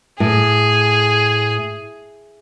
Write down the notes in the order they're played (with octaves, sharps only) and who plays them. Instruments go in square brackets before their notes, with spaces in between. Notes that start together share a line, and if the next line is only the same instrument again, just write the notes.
[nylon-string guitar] A2 [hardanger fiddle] G#4